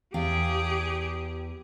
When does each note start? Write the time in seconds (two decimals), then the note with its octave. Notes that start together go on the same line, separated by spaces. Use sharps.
0.14 E2 G4 G#4 F5 G5